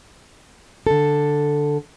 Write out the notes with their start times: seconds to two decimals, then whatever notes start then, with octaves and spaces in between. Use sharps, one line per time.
0.87 D3 A4